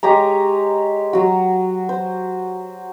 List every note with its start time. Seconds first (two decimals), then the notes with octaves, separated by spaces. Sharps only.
0.03 G#3 G4 C#5 A#5
1.13 F#3 F#4
1.89 C5